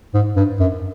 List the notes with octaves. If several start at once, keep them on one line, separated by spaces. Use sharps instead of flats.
G#2
G2
F#2